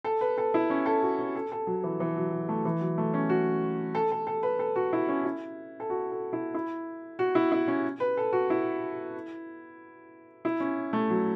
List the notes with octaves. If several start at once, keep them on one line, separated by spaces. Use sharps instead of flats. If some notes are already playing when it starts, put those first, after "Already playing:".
A4
B4
A4
E4
C#4
A4
F#4
C#4
A4
A4
F#3
E3
E3
F#3
F#3
A3
E3
F#3
A3
C#4
F#4
A4
A4
A4
B4
A4
F#4
E4
C#4
E4
A4
F#4
A4
E4
E4
F#4
E4
E4
C#4
B4
A4
F#4
E4
E4
C#4
A3
F#3